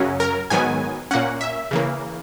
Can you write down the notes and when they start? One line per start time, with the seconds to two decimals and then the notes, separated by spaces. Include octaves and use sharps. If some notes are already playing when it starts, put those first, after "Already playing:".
Already playing: F#2 C#3 F#3 C#4
0.20 A#4
0.50 G#2 D#3 F#3 B3 G#5
1.11 A#2 A#3 C#4 F#5
1.41 E5
1.71 C#3 E3 A#3